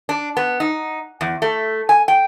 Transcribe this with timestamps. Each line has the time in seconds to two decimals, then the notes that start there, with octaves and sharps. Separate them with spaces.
0.09 D4
0.37 B3
0.60 D#4
1.21 E2
1.42 A3
1.89 G#5
2.08 G5